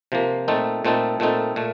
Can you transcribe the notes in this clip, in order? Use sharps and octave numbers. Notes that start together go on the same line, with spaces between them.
C3 F3 A#3
A#2 A3 C4 D#4 A4
A#2 A3 C4 D#4 A4
A#2 A3 C4 D#4 A4
A#2 A3